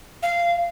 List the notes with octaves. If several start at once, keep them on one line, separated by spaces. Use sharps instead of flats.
F5